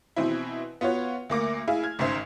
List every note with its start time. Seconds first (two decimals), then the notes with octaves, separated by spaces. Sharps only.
0.16 B2 E3 C4 E4
0.81 B3 F4 F#4 C#5
1.30 D2 A#3 D6 A#6
1.68 E4 G#4 F5 G#5
1.83 F6 G#6
1.99 G#1 G#2 C#3 C5 E5 C7